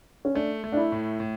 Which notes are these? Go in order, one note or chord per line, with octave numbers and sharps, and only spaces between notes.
C#4
A3 D4
A3
D4
E4
A2
A2